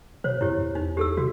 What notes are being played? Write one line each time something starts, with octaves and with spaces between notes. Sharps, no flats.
B2 C5 C#5
F2 E4 G4 C#5
E2
D#4
G4 A4 E6
C3 F#4